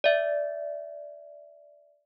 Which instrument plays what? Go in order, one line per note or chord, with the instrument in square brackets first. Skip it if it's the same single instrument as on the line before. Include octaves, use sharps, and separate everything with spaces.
[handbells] D5 E5